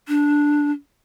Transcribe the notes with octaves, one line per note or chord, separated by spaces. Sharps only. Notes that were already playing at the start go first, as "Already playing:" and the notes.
D4